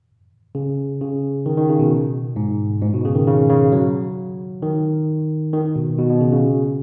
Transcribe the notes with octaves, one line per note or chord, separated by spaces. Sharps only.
C#3
C#3
D#3
D#3
C#3
B2
G#2
G#2
B2
C#3
D#3
C#3
C#3
F#3
D#3
D#3
B2
B2
B2
C#3
C#3